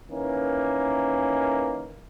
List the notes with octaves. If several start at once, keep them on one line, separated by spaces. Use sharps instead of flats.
D#3 E3 A#3 C#4